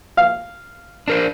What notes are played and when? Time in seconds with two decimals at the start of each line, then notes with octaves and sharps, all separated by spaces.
0.17 F5
1.08 D4 A#4 C5